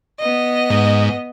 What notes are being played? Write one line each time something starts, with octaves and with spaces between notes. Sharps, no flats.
B3 D#5
G#2